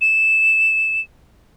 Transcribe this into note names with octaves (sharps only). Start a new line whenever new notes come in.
E7